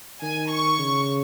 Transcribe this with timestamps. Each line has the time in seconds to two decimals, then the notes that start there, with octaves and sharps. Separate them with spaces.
0.23 D#3 G#5
0.51 C#6
0.80 C#3